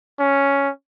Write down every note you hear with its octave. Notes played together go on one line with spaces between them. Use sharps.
C#4